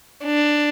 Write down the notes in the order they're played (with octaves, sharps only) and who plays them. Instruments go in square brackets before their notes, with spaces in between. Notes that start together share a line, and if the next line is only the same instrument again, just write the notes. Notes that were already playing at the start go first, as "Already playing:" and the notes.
[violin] D4